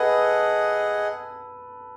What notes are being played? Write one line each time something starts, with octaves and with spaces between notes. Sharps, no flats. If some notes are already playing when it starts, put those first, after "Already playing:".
Already playing: G#4 A4 B4 D#5 F#5